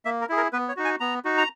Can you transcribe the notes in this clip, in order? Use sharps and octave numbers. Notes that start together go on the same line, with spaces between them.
A#3 E5
A#4
E4 G#4
A#4
B3 B4
C#5
D#4 F#4
G#5
B3 A#5
D#4 F#4
A#5